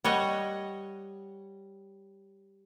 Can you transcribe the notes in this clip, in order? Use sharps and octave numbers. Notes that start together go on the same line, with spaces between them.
G3 C#5 D#5 F#5